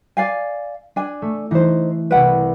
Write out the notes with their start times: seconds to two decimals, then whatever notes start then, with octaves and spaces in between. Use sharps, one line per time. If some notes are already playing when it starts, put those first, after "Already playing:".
0.17 D5 F5 G#5
0.96 D4 G#5
1.22 A3
1.51 E3 D#4 C5
2.11 C2 B4 F#5 D7